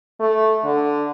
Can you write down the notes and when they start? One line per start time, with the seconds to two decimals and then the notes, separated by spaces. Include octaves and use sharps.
0.20 A3
0.64 D3